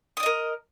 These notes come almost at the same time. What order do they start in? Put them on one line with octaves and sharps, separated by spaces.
D#6 D5 D#5 A#4